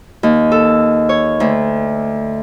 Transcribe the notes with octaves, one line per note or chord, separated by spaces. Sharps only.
D#2
A4
C#5
D2